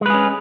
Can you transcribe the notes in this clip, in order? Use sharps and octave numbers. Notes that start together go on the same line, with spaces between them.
G#3 C#4 G#4 B4